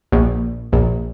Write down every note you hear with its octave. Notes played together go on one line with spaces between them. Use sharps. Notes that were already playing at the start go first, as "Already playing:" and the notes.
A#1
A#1